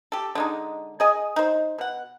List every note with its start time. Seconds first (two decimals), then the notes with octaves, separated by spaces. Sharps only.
0.12 G4 A4
0.35 D3 G#3 D#4
1.00 G#4 D#5 G#5
1.36 D#4 C5
1.78 B2 F#5